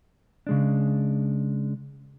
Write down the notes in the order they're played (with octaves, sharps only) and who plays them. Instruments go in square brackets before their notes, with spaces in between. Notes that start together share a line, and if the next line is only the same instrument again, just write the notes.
[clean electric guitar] C#3 G#3 D4